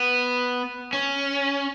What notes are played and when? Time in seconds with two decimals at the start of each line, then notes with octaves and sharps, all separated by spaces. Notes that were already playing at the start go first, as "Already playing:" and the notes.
Already playing: B3
0.93 C#4